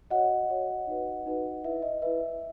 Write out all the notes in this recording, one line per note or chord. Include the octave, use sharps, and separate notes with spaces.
F#4 C#5 D#5 F#5
F#4 C#5
D#4 F#4 B4
D#4 F#4 B4
E4 B4 E5
D#5
E4 B4 E5